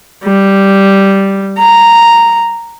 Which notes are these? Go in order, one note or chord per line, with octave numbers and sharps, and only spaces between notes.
G3
A#5